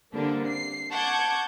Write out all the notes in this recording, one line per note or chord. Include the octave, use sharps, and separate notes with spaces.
D3 G3 A#3 C4 D4
C7
F#5 A5 C#6 D6 G6 G#6